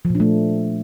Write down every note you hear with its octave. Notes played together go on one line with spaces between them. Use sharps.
F3
A#2
D4
A3